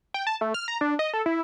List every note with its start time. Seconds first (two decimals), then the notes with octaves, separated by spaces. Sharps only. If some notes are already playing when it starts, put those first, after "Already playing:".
0.14 G5
0.27 A5
0.41 A3
0.54 F6
0.68 A#5
0.81 D4
0.99 D#5
1.14 A4
1.26 E4